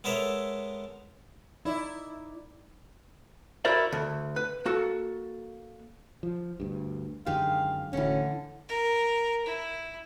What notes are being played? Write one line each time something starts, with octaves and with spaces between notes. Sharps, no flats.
G#3 B3 A4 A#4 C#5 E5
D#4 E4 D5
E4 F#4 A#4 C5 D5 E5
D2
B4
A#3 F#4 A4
F3
D2 G2
F#2 D3 D#3 G#3 G4 F5
D1 D2 D3 E3 C#4
A#4
E4